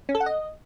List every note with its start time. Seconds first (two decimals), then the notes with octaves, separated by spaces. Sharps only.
0.09 C#4
0.15 A4
0.20 F#5
0.26 D#5